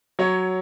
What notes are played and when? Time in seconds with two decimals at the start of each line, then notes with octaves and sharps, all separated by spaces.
0.19 F#3 C#5